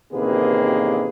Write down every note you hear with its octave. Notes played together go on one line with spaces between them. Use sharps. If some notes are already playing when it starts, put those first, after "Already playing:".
A1 C3 D#3 A#3 G#4 B4